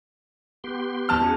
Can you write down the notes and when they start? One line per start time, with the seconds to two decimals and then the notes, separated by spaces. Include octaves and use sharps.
0.64 B3 G4 C6
1.09 E2 A5 F6
1.22 C#4 F#4 G#4